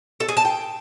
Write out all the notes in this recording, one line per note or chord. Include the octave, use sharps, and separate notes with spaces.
A4
G#4
A5
G5